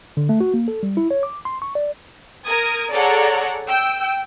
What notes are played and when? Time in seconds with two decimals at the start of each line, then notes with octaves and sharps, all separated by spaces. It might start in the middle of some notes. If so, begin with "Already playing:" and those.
0.17 D3
0.29 A3
0.40 F#4
0.54 A#3
0.68 A4
0.83 G3
0.97 E4
1.11 C#5
1.23 D6
1.45 C6
1.62 C#6
1.75 D5
2.43 A#4 D#6 G#6
2.92 G#4 A4 C#5 D5 F#5 A#5
3.67 G5 E6